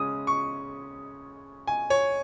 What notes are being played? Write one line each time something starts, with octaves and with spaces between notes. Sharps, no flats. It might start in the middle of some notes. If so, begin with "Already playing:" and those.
Already playing: C#3 G#3 C#4 D#6
C#6
G#5
C#5